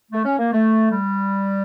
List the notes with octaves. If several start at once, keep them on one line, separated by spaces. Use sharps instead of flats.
A3
C#4
A#3
A3
G3